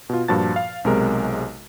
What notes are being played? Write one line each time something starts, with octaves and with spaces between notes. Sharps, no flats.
B2 F4
G2 A#2 F3 F#4 A5 A6
F5
B1 C3 G#3 A#4